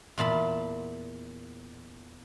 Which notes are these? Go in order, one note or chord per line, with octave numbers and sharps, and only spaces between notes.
E2 A#2 A5 B5